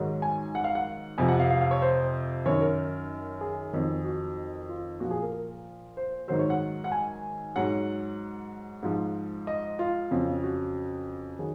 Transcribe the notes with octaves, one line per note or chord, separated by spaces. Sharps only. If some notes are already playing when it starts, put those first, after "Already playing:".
Already playing: G#2 D#3 F#3
G#5
F#5
F5
F#5
F2 C3 F3 G#5
F#5
F5
F5
F5
C#5
C5
F#2 D#3 F#3 C#5
A#4
G#4
F2 D#3 F#3
F#4
F4
A#2 F3 F#4
G#4
A#4
A#4
C5
G#2 D#3 F#3 C5
C#5
F#5
F#5
G#5
G#2 F#3 F#5
G#2 F3
D#5
F4
F2 C#3 F#3
F#4
D#3 F#3 G#4